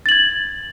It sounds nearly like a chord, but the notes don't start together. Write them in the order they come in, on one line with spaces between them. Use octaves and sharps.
A6 F#7 G#6